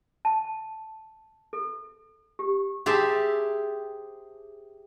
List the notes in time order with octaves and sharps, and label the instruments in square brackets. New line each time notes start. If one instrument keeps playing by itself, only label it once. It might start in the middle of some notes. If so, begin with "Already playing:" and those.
[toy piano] A5
A4
G4
[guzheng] G4 G#4 C5 E5 A5